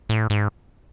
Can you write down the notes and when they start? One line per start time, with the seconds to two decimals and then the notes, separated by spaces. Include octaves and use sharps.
0.09 A2
0.30 G#2